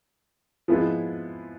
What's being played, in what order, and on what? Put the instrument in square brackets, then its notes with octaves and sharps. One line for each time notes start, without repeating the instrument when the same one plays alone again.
[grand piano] F3 G#3 B3 E4